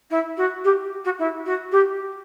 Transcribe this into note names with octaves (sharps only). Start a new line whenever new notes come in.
E4
F#4
G4
F#4
E4
F#4
G4